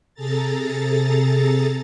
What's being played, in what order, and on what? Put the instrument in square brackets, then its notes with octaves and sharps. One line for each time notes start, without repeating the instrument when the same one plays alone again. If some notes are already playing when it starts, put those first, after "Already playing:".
[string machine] C3 G#4 A4 A#5 A6